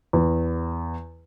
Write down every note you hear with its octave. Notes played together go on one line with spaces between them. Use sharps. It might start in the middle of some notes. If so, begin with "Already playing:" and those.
E2